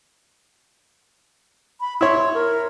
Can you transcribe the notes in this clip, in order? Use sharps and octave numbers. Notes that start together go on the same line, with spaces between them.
B5
E4 C#5 C6
A#4